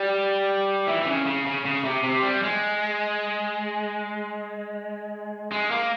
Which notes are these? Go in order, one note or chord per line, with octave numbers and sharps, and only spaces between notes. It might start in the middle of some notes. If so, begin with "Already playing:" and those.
Already playing: G3
E3
E3
C#3
C#3
C#3
C#3
C3
C3
G3
G#3
G#3
A#3